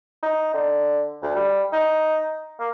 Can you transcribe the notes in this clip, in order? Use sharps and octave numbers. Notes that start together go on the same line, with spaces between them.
D#4
D3
D2
G3
D#4
A#3